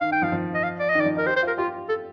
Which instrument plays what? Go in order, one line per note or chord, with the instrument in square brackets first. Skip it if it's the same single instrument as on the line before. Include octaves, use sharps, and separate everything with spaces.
[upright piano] D#3 [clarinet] F5
[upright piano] D#3 [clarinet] G5
[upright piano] F3 [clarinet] F5
[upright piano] F3
[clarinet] D#5
F5
D5
D#5
[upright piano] D#3
[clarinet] D5
[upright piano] F3
[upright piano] D#4 [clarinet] A#4
[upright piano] G4 [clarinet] C5
[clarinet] C5
[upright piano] F4 [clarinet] A#4
[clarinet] F4 [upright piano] G4
[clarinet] A4